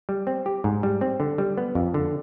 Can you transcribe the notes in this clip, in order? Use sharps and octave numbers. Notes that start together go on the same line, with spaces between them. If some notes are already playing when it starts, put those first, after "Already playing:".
G3
C4
G4
G#2
G3
C4
D3
G3
B3
F2
D3